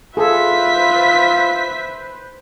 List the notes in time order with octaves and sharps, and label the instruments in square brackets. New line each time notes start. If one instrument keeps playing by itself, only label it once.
[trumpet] F4 [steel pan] G#4 A4 [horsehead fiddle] B4 C5 [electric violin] E5 B6